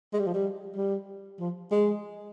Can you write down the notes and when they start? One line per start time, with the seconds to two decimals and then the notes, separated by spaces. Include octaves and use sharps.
0.13 G#3
0.19 G3
0.27 F3
0.34 G3
0.76 G3
1.39 F3
1.71 G#3